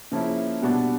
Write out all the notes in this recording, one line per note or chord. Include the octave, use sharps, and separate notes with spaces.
C#3 F3 A#3 C#4 E4
B2 G3 B3 D4 F#4